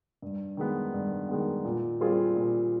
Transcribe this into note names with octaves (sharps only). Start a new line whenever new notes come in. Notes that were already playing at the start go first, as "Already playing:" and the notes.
G2
D#3 G#3 B3
G2
D#3 G#3 B3
A#2
G3 C4 F4 G#4
A#2